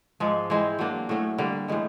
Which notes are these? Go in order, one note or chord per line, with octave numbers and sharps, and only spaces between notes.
G#2 F3 G#3
E3 G#3 C4
F#3 A#3 D4
A2 F#3 A3 C#4
D3 G3 A#3
A2 E3 G#3